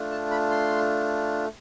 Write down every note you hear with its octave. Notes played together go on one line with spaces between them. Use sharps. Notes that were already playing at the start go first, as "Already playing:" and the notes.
Already playing: A3 D4 F4
A5
B5
C6